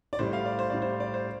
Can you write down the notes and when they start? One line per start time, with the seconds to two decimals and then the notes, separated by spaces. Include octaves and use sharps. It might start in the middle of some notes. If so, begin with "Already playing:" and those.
0.13 D5
0.19 A2 G3 C5
0.33 F5
0.46 D5
0.59 C5
0.70 A2 G3 D5
0.82 C5
1.00 D5
1.14 C5